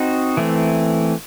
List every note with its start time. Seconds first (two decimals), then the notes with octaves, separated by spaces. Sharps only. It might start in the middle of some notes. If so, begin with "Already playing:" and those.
Already playing: C4 D#4 F#4
0.37 E3 A3 C4